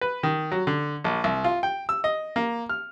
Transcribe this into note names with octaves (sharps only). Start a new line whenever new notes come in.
B4
D#3
F#3
D3
A#1
C2
F4
G5
E6
D#5
A#3
F6